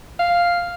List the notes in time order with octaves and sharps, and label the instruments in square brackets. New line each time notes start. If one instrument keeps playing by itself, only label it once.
[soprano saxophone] F5